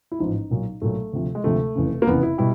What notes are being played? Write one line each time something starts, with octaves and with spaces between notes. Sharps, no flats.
E4
A1 G#2 F3 D#4
B1 A#2 F#3
B1 A#2 F#3 A3
D2 C3 F3
G#3
D2 C3 F3 A3
F1 E2 C#3
A#3
F1 E2 C#3 B3
E4
B2 G3 E4